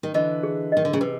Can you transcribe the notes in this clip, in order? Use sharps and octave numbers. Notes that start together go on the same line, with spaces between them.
D#3
D3 E3 D#5
G#4
D#3 D#5
D3
C#3
C3 B4